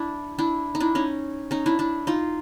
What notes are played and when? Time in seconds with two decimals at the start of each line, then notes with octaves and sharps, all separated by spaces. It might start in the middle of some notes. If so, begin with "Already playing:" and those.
Already playing: D4 E4
0.38 D4 E4
0.75 D#4
0.80 D4 E4
0.95 C#4 D#4
1.51 C#4 D#4
1.66 D4 E4
1.79 D4 E4
2.07 D#4 F4